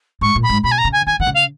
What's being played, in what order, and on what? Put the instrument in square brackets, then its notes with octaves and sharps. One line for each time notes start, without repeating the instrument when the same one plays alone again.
[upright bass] G#2 [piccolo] C#6
[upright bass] A#2
[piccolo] B5
[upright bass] G#2
[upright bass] B2 [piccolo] B5
[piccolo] G#5
A#5
[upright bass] C#3
[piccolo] G#5
[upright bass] D#3 [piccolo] G#5
[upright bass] D#3 [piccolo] F#5
[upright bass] C#3
[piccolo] F5